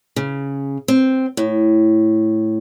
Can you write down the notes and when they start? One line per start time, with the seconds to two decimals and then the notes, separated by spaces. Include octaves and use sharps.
0.16 C#3
0.88 C4
1.37 A2